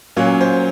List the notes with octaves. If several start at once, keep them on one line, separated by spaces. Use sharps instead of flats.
A#2 F#3 A#3 C#4 C#5
C5